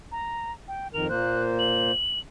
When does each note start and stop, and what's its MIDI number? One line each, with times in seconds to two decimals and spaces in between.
0.12 0.52 82
0.68 0.88 79
0.94 1.08 41
0.94 1.08 51
0.94 1.08 70
0.94 1.08 101
1.09 1.91 46
1.09 1.91 58
1.09 1.91 72
1.09 1.42 90
1.59 2.19 102